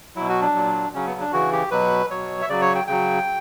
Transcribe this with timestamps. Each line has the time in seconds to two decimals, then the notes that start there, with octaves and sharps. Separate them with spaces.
0.16 B2 F#3 E4
0.29 F#4
0.42 D4
0.55 A#2 F#3
0.94 C#3 F#3 C#4
1.07 B3
1.20 D4
1.33 C#3 E3 F#4
1.52 G4
1.71 B2 F#3 B4
2.10 B2 F#3 C#5
2.42 E5
2.49 C#3 F#3 D5
2.62 C#5
2.75 G5
2.87 C#3 F#3 G5